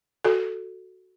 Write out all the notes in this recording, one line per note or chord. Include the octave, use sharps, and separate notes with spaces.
F#4 A4